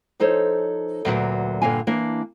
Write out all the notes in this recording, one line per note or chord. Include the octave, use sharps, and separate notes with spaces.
F3 D#4 A4 C5 C#5
D2 A#2 F#3 A#3 F#4 B4
G2 A#2 D3 A#3 F5 G#5
E3 A#3 D4